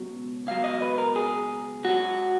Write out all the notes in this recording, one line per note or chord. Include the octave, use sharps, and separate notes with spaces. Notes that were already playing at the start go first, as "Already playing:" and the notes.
Already playing: C#2 B2 F#3
C#2 B2 F#3 F5
D#5
B4
A#4
G#4
G#2 F#3 F#4